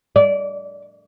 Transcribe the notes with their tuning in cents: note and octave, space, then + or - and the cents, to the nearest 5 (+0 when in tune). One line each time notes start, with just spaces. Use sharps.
D5 -25